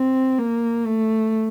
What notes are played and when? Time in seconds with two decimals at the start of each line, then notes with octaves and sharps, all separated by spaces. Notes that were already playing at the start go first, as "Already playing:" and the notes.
Already playing: C4
0.39 A#3
0.86 A3